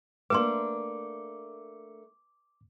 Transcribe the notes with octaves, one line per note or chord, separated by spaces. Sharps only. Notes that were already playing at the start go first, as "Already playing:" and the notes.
A3 A#3 D4 B4 C6 D6